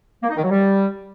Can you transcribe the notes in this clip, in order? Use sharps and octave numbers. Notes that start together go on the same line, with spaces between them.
A#3
D#4
D#3
F#3
G3